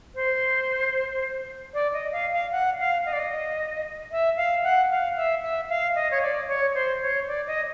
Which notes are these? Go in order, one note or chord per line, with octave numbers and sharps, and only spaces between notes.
C5
D5
D#5
F5
F5
F#5
F5
D#5
D5
D#5
E5
F5
F#5
F5
E5
E5
F5
D#5
C#5
D5
C#5
C5
C#5
D5
D#5